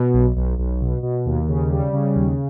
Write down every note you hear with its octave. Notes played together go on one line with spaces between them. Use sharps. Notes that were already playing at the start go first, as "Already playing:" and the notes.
Already playing: B2
B1
B1
B1
B2
B2
D#2
C#3
G3
C#3
D#2